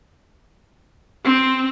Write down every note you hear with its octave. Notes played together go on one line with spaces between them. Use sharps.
C4